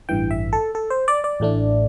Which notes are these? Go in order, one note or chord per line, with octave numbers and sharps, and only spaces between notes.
A1 G2 E3 G5
E5
A4
A4
C5
D5
D5
A1 A2 A3 D4